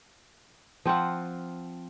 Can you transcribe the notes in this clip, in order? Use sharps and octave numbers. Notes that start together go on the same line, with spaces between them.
F3 C4 F4 F#5